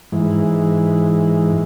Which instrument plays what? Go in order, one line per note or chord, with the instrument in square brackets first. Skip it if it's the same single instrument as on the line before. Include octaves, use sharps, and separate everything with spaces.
[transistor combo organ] G#2 E3